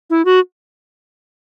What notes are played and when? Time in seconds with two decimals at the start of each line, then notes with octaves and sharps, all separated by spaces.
0.10 E4
0.25 F#4